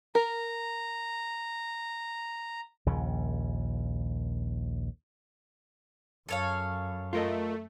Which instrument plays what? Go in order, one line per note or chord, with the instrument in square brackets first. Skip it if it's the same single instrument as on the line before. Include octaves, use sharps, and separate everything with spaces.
[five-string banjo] A#4 [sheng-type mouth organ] A#5
[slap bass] A#1 D#2 C#3
[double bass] F#2 [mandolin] A4 C#5 F5
[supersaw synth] A3 [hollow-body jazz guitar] F4 A#4 D#5